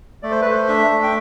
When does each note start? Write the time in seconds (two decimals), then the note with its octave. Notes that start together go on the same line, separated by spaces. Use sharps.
0.23 A3 D5
0.31 C5
0.42 A3 B4
0.51 C5
0.68 D4 E5
0.91 A3
1.03 G5